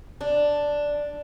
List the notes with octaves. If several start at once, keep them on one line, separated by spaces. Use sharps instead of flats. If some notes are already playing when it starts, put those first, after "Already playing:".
D4